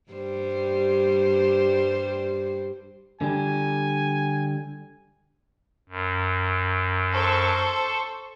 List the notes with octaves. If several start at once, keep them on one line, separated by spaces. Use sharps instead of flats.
G2 G3 C5
D3 G3 G#5
F#2
A4 C5 C#6